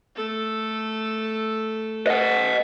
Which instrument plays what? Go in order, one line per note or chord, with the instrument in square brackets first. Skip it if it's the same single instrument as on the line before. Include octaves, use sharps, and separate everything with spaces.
[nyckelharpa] A3 A4
[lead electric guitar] D#5 F#5